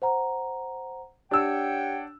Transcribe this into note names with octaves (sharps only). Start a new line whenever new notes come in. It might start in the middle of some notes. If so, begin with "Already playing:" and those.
C5 F#5 A#5
D4 G4 C#5 F#5 G5 E6